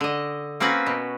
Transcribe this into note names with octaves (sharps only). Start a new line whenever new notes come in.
D3 D#5
A#3 C4 C#4 F#4 B4
B2